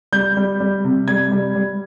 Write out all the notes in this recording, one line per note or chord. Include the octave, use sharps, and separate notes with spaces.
G3 G6
G3
G3
C3
G3 G#6
G3
G3